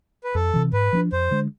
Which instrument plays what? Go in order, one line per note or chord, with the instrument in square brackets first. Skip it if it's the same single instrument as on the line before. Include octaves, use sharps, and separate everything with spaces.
[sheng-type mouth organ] B4
[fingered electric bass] F2 [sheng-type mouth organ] A4
[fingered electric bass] C3 E3
[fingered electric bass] G#2 [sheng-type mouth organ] B4
[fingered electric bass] F3 B3 D4
[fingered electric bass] F2 [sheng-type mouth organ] C5
[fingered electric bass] D3 G#3